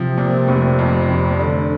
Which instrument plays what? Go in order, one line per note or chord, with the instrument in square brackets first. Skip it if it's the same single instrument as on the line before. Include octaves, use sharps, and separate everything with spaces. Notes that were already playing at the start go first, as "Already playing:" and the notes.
Already playing: [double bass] C3 [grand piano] F3
[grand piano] A#2
F1
F2
F1
[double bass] D3 [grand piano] D4